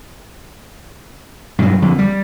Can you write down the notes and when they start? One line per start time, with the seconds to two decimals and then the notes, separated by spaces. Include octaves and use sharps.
1.59 G2 B2 F#3
1.82 F2 D3
1.99 G3